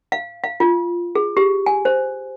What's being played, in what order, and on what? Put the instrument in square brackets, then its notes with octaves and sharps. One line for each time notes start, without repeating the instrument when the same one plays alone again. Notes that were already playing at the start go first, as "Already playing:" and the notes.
[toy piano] F5
F5
F4
G#4
G4
G#5
C5